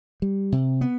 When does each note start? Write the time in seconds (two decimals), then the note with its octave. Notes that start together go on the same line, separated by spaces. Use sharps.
0.22 G3
0.52 C3
0.81 B3